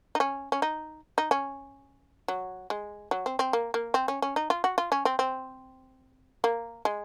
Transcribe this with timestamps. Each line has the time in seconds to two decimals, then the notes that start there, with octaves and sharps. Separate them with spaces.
0.15 D#4
0.20 C#4
0.52 C#4
0.62 D#4
1.18 D#4
1.31 C#4
2.28 F#3
2.70 G#3
3.11 F#3
3.26 C4
3.39 C4
3.53 A#3
3.74 A#3
3.94 C4
4.08 C#4
4.22 C#4
4.36 D#4
4.50 F4
4.64 F#4
4.78 F4
4.92 C#4
5.05 C4
5.19 C4
6.44 A#3
6.85 G#3